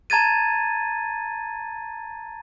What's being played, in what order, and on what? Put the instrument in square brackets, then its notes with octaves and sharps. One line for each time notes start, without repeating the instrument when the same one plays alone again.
[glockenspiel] A5 A#5 G#6 A6 D#7